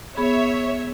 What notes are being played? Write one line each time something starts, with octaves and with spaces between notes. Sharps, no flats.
B3 G#4 C#5 E5 B5